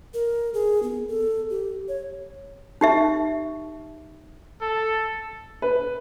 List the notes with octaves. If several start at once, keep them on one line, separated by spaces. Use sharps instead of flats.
A#4
G#4
B3
A4
G4
C#5
D#4 G4 E5
A4
B4